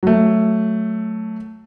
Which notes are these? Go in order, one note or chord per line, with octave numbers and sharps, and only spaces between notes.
F#3 A3